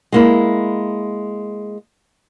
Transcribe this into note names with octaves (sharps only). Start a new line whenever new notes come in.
G#3 A#3 E4